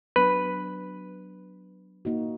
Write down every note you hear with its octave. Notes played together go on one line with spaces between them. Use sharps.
F#3 B3 D4 B4
A#3 D#4 F#4